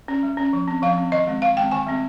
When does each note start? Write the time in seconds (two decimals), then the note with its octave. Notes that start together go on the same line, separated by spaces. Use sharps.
0.08 C#4
0.23 G3
0.37 C#4
0.53 F3
0.68 C4
0.82 F3 F5
0.98 C4
1.12 D#3 D#5
1.27 G#3 C4
1.42 D#3 F5
1.57 G#3 C4 G5
1.71 D#3 G#5
1.87 G3 C4